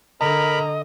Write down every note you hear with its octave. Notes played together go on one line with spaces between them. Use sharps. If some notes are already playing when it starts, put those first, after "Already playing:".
D3 A#4 D#5 A#5 B5